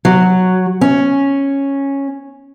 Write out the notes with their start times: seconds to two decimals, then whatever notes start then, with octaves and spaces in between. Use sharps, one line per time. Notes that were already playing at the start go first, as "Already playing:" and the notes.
0.05 F#3
0.81 C#4